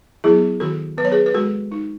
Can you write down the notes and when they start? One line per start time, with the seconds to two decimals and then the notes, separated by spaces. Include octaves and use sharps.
0.24 F#3 B3 E4 G#4
0.60 D#3 F#4 A4
0.98 F#3 B3 B4
1.05 C#5
1.12 G#4 B4
1.26 B4
1.34 G#3 F#4 A4
1.72 D#4